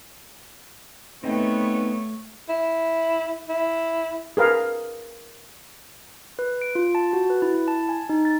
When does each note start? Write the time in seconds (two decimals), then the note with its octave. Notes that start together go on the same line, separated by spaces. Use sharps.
1.24 A3 B3 C4 D#4 C#5 G5
2.49 E4
3.49 E4
4.37 G#4 A#4 B4 F5
6.39 B4
6.62 D7
6.75 F4
6.95 A5
7.13 F#4
7.30 B4
7.42 E4
7.54 E4
7.68 A5
7.89 G#5
8.09 D#4
8.25 A6